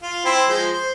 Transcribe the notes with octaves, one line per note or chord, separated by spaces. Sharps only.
F4
C4 E4 C6
F3 G#3 C5
C5